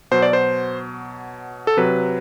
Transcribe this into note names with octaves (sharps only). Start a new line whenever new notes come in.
B2 F#3 C5
D5
C5
A4
C3 F#3 B4